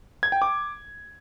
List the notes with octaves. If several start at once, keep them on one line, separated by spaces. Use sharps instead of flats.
G#6
G5
D6